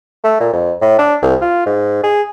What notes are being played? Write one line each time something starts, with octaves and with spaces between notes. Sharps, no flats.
A3
A#2
F2
A2
D4
C2
F4
G#2
G#4